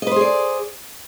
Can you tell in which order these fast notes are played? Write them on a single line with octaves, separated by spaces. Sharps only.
D#5 B4 C5 G#4 D5